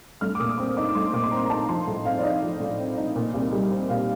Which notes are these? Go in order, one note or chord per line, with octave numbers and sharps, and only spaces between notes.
A3 F6
D6
A#2 D#6
D#6
C4 D6
D#4 D6
D6
A3 C6
A#2 D6
C6
C4 A#5
A#5
D#4 A5
F3 C6
A2
C4 F5
D5
D#4 D#5
F3
A2
C4
D#4
A#2
C2
G3
C4
A#2 F5